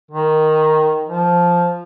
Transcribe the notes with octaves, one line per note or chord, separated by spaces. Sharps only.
D#3
F3